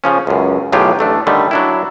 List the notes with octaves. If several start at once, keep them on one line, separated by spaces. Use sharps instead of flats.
C#3 F3 C#4
C#2 F#2
B1 A2 C#3 F#3 F4 G4
A1 A3 D4
D3 D#3 G3 A3 C#4
F#3 D4 E4